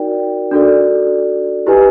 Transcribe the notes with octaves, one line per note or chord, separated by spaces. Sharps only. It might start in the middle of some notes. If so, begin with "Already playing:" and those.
Already playing: D#4 F#4 A#4 D5 G5
D4 F#4 A4 D5
E4 G4 B4 D#5 G#5